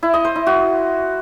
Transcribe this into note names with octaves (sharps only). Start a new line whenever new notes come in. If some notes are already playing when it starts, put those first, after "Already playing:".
E4
D#5
C5
E4
F#4